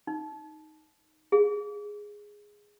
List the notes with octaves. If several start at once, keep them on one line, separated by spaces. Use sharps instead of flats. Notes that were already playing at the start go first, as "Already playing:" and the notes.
D#4
G#4